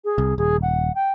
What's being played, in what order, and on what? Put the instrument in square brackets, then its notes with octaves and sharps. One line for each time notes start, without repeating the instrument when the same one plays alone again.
[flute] G#4
[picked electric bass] C2
[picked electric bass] D#1 [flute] G#4
[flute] F#5
G5